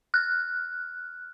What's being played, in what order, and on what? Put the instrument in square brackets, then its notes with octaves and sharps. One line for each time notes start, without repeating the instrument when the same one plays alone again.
[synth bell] F6 F#6